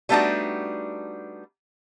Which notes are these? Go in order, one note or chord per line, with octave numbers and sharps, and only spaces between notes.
G3 A3 B3 D4 D#4 F#4